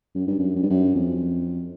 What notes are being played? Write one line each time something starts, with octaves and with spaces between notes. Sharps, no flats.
F#2
G2
F#2
F#2
G2
F#2
F2